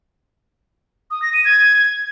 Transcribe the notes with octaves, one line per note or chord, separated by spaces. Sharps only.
D#6
A#6
D#7
G#6